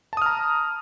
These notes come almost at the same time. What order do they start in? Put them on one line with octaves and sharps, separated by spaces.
A5 D#6 F6 A#5